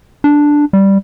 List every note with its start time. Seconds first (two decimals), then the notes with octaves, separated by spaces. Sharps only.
0.24 D4
0.73 G3